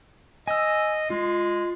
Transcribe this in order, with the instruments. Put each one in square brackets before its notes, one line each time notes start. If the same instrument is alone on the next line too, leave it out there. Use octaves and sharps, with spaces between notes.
[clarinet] D#5 [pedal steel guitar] G#5 E6
[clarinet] G#3 [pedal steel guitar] F4